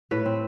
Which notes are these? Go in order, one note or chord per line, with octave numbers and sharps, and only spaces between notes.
A2 B4
C4